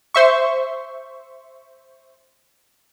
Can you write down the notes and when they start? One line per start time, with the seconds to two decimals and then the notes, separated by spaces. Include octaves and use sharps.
0.15 C5 E5 C#6